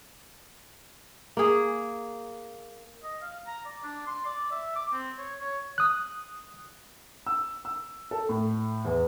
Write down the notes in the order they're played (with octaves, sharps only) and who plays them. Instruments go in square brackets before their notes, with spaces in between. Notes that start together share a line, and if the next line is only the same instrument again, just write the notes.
[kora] A#3 G#4
[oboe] D#5
F5
A#5
D5
D4
C6
D5
E5
D6
C4
C#5
C#5
[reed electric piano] D#6 F#6
[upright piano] E6
E6
A4
A2
E2